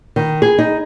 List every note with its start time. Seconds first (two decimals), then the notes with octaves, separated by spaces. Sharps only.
0.16 D#3
0.42 G#4
0.58 D#4